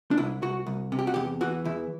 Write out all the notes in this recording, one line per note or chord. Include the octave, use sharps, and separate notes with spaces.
D4
C2 E4
C2 F#4
C2
C3
G4
F#4
E2 G4
E3 F#4
E2 E4